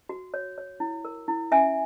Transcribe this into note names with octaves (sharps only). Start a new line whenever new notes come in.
F#4
C#5
C#5
E4
A#4
E4
C#4 E5 G#5